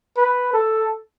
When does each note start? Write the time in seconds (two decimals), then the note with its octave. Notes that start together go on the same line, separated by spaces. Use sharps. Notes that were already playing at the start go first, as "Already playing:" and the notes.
0.17 B4
0.53 A4